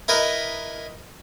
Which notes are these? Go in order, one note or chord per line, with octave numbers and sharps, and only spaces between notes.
E4 A#4 B4 D#5